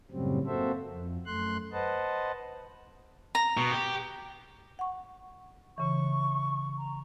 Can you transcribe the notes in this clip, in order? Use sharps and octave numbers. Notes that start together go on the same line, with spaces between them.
F#2 A2 C#3 F#3 G3 C4
A#3 C4 F#4 A4 C5 E5
F2
F#2 A3 C6 F#6
B4 C5 D#5 F#5 A5
A#5
B2
G4
F#5 C#6
C#3 E3 C#6
A#5